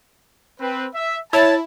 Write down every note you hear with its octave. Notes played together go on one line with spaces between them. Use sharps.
C4 B4
E5
E4 C#5 A5